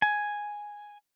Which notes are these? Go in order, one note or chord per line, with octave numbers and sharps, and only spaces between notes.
G#5